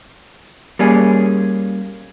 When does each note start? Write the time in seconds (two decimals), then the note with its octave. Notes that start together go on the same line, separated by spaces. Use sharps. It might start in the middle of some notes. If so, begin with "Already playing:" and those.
0.79 G3 A#3 C#4 G#4